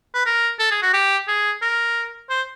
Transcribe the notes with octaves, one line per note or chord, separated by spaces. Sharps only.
B4
A#4
A4
G#4
F#4
G4
G#4
A#4
C5